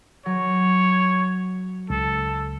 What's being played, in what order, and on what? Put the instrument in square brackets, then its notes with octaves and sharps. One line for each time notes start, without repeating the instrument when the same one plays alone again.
[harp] F#3 [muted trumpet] C#5
[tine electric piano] C#2 [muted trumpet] A4